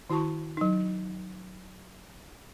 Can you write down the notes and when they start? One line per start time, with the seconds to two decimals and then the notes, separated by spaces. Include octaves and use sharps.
0.10 D#3 E4 F#4 A5 C#6
0.57 F#3 D#4